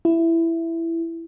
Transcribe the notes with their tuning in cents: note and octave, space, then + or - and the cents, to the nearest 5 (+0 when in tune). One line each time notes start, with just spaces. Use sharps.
E4 +10